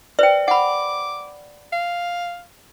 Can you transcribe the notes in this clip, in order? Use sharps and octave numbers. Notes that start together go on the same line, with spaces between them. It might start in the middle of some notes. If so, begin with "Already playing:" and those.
B4 C5 D5 G5
F#5 B5 D6
F5